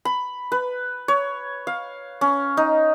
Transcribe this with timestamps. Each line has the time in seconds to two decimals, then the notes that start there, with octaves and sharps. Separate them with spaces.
0.05 B5
0.52 B4
1.08 C#5
1.67 F5
2.21 C#4
2.57 D#4